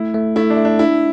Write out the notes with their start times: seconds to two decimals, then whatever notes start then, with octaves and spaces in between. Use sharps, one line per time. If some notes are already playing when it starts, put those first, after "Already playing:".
Already playing: A3 E4
0.14 A3
0.36 A3 E4
0.50 D4
0.57 A3
0.65 D4
0.79 D4 E4